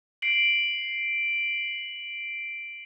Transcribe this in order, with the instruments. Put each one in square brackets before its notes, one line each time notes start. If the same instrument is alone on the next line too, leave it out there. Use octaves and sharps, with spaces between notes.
[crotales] C7 D7 F#7